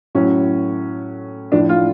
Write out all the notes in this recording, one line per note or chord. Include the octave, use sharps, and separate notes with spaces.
A2 F#3 C#4
A2 F3 D4
F4